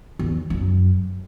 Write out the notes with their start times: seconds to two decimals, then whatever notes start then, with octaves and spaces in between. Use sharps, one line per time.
0.19 E2
0.50 F#2